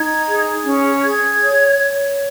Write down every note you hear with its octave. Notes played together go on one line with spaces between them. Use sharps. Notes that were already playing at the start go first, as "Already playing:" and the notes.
Already playing: D#4 G#6
G#4
C#4
G#4 G#6
C#5
C#5